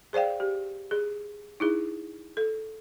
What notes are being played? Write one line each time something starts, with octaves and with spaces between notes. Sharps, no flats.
G#4 C5 D5 F5 G5
G4
G#4
D#4 E4 G#4
A4